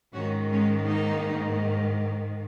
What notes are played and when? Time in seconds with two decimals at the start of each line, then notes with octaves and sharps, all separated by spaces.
0.13 G#2 D#3 C#4 F#4
0.51 G#3 C#4
0.87 A#3 D#4